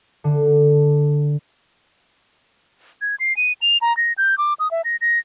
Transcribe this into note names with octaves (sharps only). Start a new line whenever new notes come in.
D3
G#6
C7
D#7
F7
A#5
A#6
G6
D6
D#6
E5
A#6
A#6